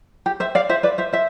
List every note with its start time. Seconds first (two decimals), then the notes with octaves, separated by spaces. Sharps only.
0.26 G4
0.40 C5 E5
0.55 D5 F5
0.69 C5 E5
0.83 B4 D5
0.98 C5 E5
1.13 C5 E5